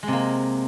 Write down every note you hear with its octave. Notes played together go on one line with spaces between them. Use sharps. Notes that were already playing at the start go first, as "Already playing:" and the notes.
C3 G#3 A#3